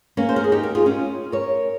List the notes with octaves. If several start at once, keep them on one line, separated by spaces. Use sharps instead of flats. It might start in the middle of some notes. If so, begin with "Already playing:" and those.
A#3 C#4
C5
A#4
G#4
D#4 G4
G4 A#4
F4 G#4
C#4 F4
A#4 C#5